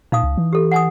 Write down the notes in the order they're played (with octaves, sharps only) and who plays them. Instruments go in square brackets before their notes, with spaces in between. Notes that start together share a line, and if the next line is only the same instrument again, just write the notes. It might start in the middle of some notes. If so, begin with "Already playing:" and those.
[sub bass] A#2 [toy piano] D#4 F5 D#6
[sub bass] C#2
E3
[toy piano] G4 A4
F#5 G#5 D#6